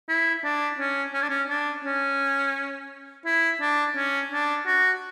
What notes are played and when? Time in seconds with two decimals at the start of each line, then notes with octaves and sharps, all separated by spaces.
0.09 E4
0.44 D4
0.79 C#4
1.14 C#4
1.22 D4
1.29 C#4
1.49 D4
1.85 C#4
3.26 E4
3.61 D4
3.96 C#4
4.32 D4
4.67 F#4